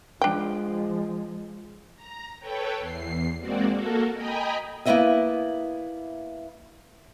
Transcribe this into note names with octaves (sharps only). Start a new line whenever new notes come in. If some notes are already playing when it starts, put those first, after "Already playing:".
F3 G#3 D4 G5
A#5
A4 B4 C#5 G5
E2 C7
G#3 A#3 C4 F#4 D5
A#3 F#4 A4 A#4
D#5 G5 G#5 A#5 B5 D#6
A#3 B3 D4 E4 D#5 E5